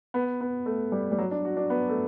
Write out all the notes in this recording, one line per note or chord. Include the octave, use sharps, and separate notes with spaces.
B3
B3
A3
G3
G3
F#3
D4
F#4
D4
B3
A3